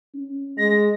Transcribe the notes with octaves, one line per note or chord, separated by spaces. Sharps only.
C#4
G#3 A#6